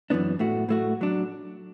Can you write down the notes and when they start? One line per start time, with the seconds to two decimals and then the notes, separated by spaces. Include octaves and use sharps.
0.10 F#2 E3 B3 D4
0.39 A2 A3 F#4
0.69 A2 A3 F#4
1.01 F#3 D4